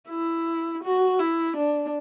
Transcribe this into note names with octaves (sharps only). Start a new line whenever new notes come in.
E4
F#4
E4
D4